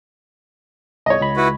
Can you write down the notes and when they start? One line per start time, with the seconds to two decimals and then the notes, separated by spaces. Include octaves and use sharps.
1.06 C2 C#5 D#5
1.21 C#2 B5
1.37 E4 F#4 B4